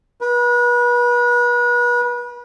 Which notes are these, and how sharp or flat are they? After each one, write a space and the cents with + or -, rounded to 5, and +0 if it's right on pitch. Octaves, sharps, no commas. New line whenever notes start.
B4 -35